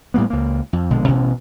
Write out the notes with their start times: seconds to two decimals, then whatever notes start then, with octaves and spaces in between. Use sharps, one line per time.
0.14 A2 G3 A#3 B3
0.30 C#2 A#3
0.73 F2
0.90 A#1 B2 D3 G#3
1.08 A1 B2 C#4